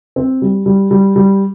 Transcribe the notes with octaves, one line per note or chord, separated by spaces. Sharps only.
C4
G3
G3
G3
G3